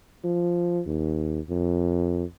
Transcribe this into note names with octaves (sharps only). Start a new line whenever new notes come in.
F3
D#2
F2